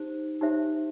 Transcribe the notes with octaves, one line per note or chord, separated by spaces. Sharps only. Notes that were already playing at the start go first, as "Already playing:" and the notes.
Already playing: D#4 G4 C5
D#4 G4 C5 E5